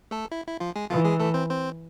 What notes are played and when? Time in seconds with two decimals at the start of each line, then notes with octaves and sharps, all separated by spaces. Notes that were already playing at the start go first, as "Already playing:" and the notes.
0.11 A3 A4
0.32 E4
0.47 E4
0.60 F3 F4
0.76 G#3 G#4
0.90 E3 F3 F4
1.04 G#3 G#4
1.19 A3 A4
1.34 C4 C5
1.49 C4 C5